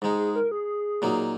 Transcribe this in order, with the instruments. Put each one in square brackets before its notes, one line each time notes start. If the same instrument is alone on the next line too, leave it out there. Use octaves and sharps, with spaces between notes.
[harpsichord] G#2 G#3 D#4 [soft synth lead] G#4
[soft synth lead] G#4
A#4
G#4
[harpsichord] A#2 F#3 A#3 D#4